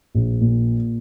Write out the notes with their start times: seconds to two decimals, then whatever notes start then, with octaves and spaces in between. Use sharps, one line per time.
0.15 A#1
0.41 A#2